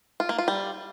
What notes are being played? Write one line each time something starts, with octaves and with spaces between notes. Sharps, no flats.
F4
A#3
F4
G3